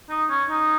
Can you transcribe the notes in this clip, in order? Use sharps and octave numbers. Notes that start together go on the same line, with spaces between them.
D#4
C#4
D#4